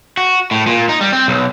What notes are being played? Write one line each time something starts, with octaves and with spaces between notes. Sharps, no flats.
F#4
A2
A#2
D#4
G3
C4
B1